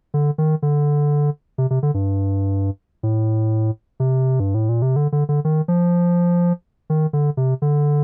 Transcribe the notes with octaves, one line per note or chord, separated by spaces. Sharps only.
D3
D#3
D3
C3
C3
D3
G2
A2
C3
G2
A2
A#2
C3
D3
D3
D3
D#3
F3
D#3
D3
C3
D3